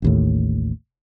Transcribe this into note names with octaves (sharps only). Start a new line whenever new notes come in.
A1 D#2 A2